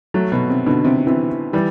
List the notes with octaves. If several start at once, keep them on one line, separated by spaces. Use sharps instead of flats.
F#3 A3
B2
C3
B2 D3
C3
C3 E3
E3 G3